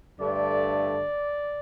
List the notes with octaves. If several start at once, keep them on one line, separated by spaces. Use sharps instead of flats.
G2 D3 A3 D5